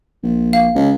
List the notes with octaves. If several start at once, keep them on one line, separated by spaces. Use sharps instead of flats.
A#1
F5
C#2